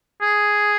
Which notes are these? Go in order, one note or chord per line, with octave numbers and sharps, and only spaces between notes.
G#4